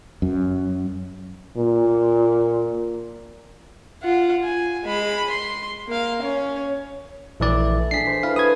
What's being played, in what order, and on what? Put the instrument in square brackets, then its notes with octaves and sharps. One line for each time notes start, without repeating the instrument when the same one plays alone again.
[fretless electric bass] F#2
[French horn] A#2
[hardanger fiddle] F4 F#5
G#5
G#3 B5
C6
A#3 F5
C#4 C#5
[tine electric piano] A#1 E3 D5 [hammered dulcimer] A3
[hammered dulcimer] D4 G#4 A4 [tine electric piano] B6 C7
[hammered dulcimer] C5
[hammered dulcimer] E4 B4 [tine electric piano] F5
[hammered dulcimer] B4 C#5 [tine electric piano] D#6 G#6